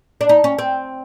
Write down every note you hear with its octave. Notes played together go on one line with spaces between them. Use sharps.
D4
D#4
C#4
C4